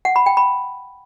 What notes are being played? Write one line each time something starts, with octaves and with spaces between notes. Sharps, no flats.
F#5
B5
G5
B5